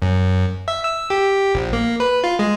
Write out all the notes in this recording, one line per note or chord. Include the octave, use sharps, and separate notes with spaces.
F#2
E5
E6
G4
A#1
A#3
B4
F4
G#3